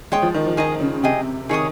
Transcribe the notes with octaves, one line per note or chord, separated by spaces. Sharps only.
G#3 C#5 G5 C6 D#6
F3
D#3
F3
D#3 G#4 D#5 A#5
C#3
C3 G#4 D#5 G5
D#3 G#4 C#5 G#5 D#6